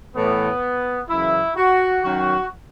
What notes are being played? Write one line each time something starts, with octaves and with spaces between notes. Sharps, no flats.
A2 E3 B3
F#2 C#3 E3 E4
F#4
F#2 D#3 F#3 F#4